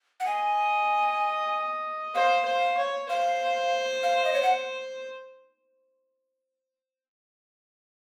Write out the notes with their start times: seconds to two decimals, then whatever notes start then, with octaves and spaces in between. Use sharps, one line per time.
0.20 F#5
0.26 D#5 G#5
2.14 C5 F5
2.45 C5
2.77 C#5
3.09 C5 F5
4.03 F5
4.25 D#5
4.34 C#5
4.43 F#5